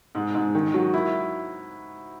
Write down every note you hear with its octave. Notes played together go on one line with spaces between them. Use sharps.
G#2
G#2
D#3
F#3
E4